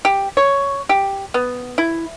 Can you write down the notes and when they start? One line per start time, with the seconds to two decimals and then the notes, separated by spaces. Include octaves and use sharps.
0.05 G4
0.37 C#5
0.89 G4
1.34 B3
1.78 E4